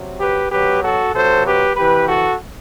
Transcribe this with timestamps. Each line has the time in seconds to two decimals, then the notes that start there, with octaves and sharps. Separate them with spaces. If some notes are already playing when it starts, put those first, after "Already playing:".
Already playing: C3 F#3
0.19 G4 B4
0.51 B2 F#3 G4 B4
0.83 F#4 A4
1.14 C3 F#3 A4 C5
1.46 G4 B4
1.76 C3 E3 G4 B4
2.08 F#4 A4